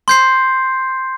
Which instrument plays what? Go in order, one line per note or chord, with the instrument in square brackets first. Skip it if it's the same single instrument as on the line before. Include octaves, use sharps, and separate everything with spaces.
[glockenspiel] C6 G6 C7